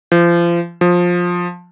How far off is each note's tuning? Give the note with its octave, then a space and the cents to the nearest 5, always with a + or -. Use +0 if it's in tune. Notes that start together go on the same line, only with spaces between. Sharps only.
F3 -30
F3 +15